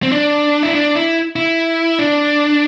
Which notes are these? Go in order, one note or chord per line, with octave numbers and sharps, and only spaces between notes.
C4
D4
E4
D4
E4
E4
D4